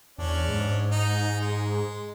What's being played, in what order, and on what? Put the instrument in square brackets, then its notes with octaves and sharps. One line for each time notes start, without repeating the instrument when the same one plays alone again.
[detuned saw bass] E2 [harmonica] C#4 D4
[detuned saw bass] G#2
[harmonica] D#4
G#3